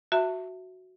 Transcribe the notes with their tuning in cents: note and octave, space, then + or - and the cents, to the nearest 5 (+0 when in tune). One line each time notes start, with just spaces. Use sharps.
F#4 +0 E5 +0 A5 +35